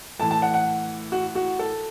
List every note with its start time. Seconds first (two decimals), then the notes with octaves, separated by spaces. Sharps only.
0.19 A2 E3 A5
0.31 A5
0.42 F#5
0.54 F#5
1.12 F#4
1.35 F#4
1.59 A4